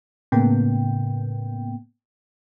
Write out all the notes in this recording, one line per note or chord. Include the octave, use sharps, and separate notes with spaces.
A2 C#3 A#3 B3 G5